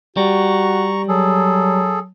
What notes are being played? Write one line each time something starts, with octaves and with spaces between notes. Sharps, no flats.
G3 F#4 A#5 C#6
F#3 G#4 A4